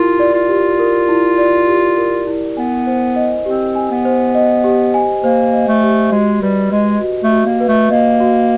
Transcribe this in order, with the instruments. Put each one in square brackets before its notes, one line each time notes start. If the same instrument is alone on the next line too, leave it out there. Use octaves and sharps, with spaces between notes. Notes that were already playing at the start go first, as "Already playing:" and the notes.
Already playing: [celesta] E4 G4 A#4 [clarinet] F4
[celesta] D5
[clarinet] F4
[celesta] G4
A#4
E4
D5
G4
A#4
E4
[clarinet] B3 [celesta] G#5
[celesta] C5
D#5
[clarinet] C4 [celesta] G4
[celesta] G#5
[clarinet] B3
[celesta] C5
D#5
G4
G#5
[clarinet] A#3 [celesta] C5
[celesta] D#5
[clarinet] A3
[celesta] G4
[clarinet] G#3 [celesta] F#4
[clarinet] G3 [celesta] B4
[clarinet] G#3 [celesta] D#5
[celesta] F#4
[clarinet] A3
[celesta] F#4
[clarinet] A#3
[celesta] B4
[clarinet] A3
[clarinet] A#3 [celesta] D#5
[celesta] F#4